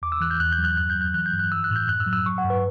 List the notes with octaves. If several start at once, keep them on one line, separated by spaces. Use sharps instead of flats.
E2 D6
E6
E3 F#6
G6
E2 F#6
G6
F#3
F#6
G2 F#6
G6
F#3
F#6
E3 F#6
G6
G2
F#6
E3 E6
F#6
A2
G6
F#2 F#6
E6
F#3
E6
F#3 C#6
F#5
G2
B4